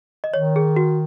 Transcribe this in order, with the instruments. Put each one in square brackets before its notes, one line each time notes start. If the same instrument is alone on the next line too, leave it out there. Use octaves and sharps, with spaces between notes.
[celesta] D#5
[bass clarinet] D#3 [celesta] C#5
[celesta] G#4
F#4